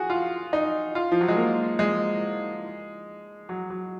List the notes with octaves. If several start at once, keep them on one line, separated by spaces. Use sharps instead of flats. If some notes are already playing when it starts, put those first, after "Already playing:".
Already playing: F#4 G#4
F4
D#4
F4
F3
F#3
G#3
A#3
G#3
F#3
F#3